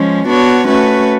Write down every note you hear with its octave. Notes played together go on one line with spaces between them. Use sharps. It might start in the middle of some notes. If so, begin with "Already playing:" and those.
Already playing: F3 G#3 C#4
B3 D4 F#4 C#5
A3 C#4 F#4 B4